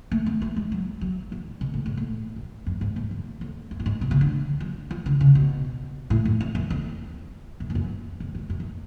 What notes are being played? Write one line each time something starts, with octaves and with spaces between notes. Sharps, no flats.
A3
B3
A3
G#3
F#3
F#3
F#3
B2
A2
G#2
A2
F#2
F#2
G#2
G#2
F#2
F2
F#2
A2
G#2
B2
C#3
D3
F#3
F3
D3
C#3
B2
A2
F#2
F2
F#2
F2
F#2
G#2
F#2
F2
F#2
F#2
F#2